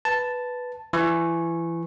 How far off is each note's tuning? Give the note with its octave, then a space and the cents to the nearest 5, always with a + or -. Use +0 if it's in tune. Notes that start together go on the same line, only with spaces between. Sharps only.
B4 +0 A5 +0
E3 +25 C#6 -15